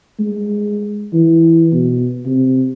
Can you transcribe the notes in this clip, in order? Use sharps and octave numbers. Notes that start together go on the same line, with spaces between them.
G#3
E3
B2
C3